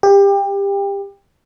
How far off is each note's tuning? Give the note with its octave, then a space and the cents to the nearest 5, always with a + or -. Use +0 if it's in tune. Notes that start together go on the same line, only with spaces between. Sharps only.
G4 +25